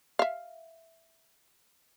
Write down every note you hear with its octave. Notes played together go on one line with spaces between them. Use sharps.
E5 F5